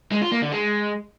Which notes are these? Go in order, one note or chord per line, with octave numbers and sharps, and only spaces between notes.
G#3
F4
A#3
D3
G#3